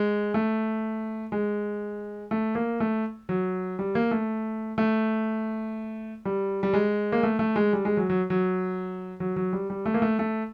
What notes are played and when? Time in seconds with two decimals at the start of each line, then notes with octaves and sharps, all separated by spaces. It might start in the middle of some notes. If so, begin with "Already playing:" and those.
Already playing: G#3
0.34 A3
1.32 G#3
2.31 A3
2.55 A#3
2.80 A3
3.29 F#3
3.79 G3
3.95 A#3
4.11 A3
4.78 A3
6.25 G3
6.63 G3
6.73 G#3
7.12 A#3
7.23 A3
7.39 A3
7.56 G#3
7.73 G3
7.85 G#3
7.97 F#3
8.10 F#3
8.30 F#3
9.20 F#3
9.36 F#3
9.53 G3
9.70 G3
9.86 A3
9.94 A#3
10.02 A3
10.19 A3